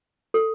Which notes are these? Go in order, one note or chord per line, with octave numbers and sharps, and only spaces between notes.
A4